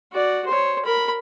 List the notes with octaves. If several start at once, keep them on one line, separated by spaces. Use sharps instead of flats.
F#4 D5
C5 C#5
A#4 B5